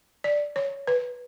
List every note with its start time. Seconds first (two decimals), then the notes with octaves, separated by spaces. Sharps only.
0.24 D5
0.56 C#5
0.87 B4